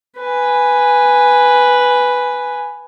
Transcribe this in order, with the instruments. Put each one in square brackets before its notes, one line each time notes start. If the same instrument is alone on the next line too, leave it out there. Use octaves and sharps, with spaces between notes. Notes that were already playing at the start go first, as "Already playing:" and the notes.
[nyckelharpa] B4 G#5